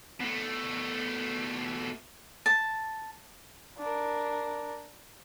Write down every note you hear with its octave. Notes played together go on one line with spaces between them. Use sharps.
B2 A3
A5
D4 A#4